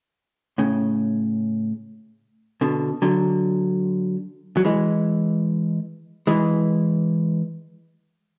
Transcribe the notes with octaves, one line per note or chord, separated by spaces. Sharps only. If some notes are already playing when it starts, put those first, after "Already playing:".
A2 C#3
B2 D3
D3 F#3
F#3
E3 G#3
E3 G#3